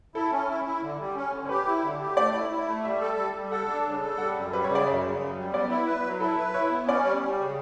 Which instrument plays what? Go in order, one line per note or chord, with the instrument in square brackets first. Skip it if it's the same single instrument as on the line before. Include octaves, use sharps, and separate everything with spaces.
[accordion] E4 [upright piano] A4
[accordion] C#4
E4
E4
D3
G3
C#4
D3
[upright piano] C#5
[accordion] G4 [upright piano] B4
[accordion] E4
D3
G4
[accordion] A3 [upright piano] D5
[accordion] E4
E4
A3
[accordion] G3 [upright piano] E5
[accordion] A4
G3
G3
[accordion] A4 [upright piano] F#5
[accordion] D4
C#3
A4
[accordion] G3 [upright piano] F#5
[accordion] F#2
[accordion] G3 [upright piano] B4
[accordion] C#3 [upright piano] C#5
[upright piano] D5
[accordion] F#2 [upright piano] E5
[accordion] C#3
F#2
G3
[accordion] B3 [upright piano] D5
[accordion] E4
B4
F#3
[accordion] E4 [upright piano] A4
[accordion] B4
[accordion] E4 [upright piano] C#5
[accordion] B3
[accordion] C#4 [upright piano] D5
[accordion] G3
G3
C#3